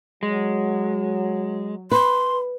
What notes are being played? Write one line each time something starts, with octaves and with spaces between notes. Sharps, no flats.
F#3 G#3
B4 C6